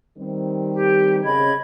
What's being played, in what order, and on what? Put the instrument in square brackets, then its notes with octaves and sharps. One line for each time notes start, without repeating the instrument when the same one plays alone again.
[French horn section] D#3 G3 C4
[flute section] G4
[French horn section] C#3 [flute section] D#5 B5 G#6